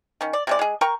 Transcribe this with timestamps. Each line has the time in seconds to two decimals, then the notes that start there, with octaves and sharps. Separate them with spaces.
0.21 D#3 C#4
0.33 D5
0.47 C3 G#3 D5
0.59 G#3 G#4
0.81 A#4 G5 A#5 C#6